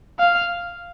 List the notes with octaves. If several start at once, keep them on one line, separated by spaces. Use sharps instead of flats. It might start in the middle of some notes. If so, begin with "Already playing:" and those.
F5